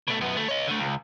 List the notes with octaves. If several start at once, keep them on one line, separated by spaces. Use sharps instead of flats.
B2 A3
F#2 B3
D2 A3
C#5 D#5
D3 A3
C#2